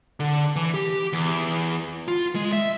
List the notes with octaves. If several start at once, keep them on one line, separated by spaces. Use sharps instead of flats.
D3
E3
G4
E2
F4
G#3
E5